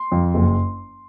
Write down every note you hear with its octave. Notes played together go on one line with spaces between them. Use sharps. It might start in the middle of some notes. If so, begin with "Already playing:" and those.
Already playing: C6
F2
F#1